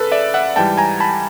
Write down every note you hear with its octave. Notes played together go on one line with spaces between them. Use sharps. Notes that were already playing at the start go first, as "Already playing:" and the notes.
Already playing: D2 C#3 A4 B4
D5 E5
E5 F#5
G#2 E3 G3 G5 A5
G#5 A#5
A5 B5